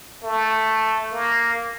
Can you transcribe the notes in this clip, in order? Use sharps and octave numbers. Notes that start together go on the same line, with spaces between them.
A3
A#3